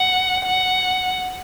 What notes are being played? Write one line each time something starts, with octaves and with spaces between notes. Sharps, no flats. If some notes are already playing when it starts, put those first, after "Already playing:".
Already playing: F#5
F#5